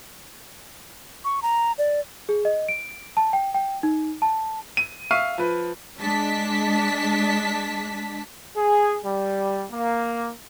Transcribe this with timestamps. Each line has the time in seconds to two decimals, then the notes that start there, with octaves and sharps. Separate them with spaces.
1.25 C#6
1.42 A#5
1.78 D5
2.29 G#4
2.45 D#5
2.69 D7
3.17 A5
3.33 G5
3.54 G5
3.83 D#4
4.22 A5
4.77 D#7
5.11 E5 F5 C#6 F6 C7 D#7
5.38 F3 B4
5.99 G#3 D4 A5 B6
8.56 G#4
9.04 G3
9.72 A#3